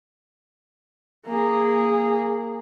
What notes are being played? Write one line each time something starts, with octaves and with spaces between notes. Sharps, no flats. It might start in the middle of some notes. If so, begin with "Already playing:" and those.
A#3 G#4